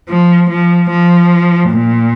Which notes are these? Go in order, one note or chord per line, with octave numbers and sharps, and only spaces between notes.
F3
F3
F3
A#2